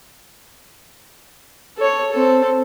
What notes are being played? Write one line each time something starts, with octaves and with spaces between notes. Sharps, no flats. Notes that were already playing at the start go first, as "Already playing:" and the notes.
A4 C#5
C4 A4